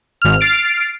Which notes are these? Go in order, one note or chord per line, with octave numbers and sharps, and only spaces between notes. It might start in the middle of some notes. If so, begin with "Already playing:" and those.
G#1 F6
F6 A6 C7 D7